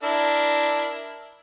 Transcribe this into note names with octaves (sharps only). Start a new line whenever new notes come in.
D4 E4 A#4